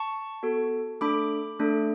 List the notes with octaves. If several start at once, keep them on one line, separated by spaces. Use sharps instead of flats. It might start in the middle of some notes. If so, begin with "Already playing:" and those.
Already playing: A5 C#6
B3 F#4 A4
A3 D4 A4 B5 D6
A3 D4 A4